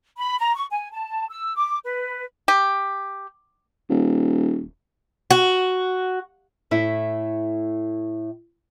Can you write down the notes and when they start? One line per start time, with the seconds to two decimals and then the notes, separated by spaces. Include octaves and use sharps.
0.17 B5
0.38 A#5
0.55 C#6
0.70 G#5
0.92 A5
1.29 E6
1.56 D6
1.84 B4
2.48 G4
3.90 D#1
5.31 F#4
6.71 A2 A3 E4